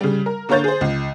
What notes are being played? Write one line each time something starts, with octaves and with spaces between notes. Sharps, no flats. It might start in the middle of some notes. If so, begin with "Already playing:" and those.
C#3 G3
A#4
D3 A#3 A#4 C#5 G6 A6
G#4 C5
C#2